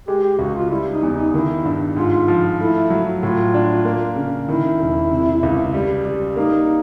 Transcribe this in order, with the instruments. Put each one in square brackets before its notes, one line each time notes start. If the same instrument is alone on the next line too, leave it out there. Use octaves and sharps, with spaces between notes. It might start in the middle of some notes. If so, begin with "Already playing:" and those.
[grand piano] G#3 [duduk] G4
[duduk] G4
[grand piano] C#2 [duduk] F#4
[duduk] F4
[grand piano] G3 [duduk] E4
[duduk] D#4
[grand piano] E2
[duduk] D#4
[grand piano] D#3 [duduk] E4
[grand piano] G2
[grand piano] G#2 [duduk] F4
[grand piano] F3
[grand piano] A3 [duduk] E4
[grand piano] F#3
[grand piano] A2 [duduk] F4
[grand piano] D4
A#3
C#3
[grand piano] D#3 [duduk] E4
[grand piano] E1
C3
C#2
G3
G3
[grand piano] A#3 [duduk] D#4